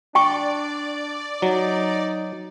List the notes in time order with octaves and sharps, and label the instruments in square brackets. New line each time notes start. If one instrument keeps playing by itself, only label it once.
[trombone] D4 [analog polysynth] D5 [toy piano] G5 C#6
[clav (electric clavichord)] F#3 [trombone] D#4